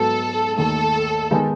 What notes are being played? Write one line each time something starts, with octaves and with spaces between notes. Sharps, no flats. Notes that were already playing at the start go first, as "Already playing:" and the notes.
Already playing: G#2 F#3 B3 F#4 A4
D#2 D#3 A3 A4
D#3 G#3 B3 D#4